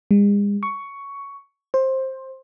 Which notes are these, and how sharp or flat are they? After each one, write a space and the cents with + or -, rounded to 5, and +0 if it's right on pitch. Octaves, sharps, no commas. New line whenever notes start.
G#3 -40
C#6 +10
C5 +15